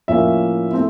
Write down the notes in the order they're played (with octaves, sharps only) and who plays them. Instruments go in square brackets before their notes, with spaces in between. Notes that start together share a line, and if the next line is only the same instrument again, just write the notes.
[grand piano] A2 F3 A#3 C#4 E4 E5
A3 C4 E4